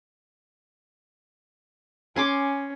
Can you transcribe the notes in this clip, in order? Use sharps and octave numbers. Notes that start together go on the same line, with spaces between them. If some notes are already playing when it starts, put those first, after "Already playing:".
C#4 G#5 C6 D6